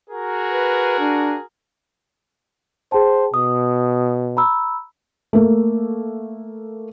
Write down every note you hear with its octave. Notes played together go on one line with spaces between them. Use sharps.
F#4 G#4 A#4
B4
D4
G#4 C5 G5 A5
B2 D#6
A#5 B5 E6
A3 A#3